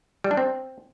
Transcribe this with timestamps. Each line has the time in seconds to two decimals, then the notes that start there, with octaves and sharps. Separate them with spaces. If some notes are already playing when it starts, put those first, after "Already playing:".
0.24 G3
0.31 D4
0.37 C4